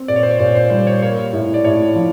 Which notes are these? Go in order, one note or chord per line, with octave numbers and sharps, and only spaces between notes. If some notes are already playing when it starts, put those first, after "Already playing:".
Already playing: C4
A#2 D5
C#5
C5
C#5
A#2 D5
C5
G3 C5
C#5
A#3 C#5
A2
D5
A2 C#5
F3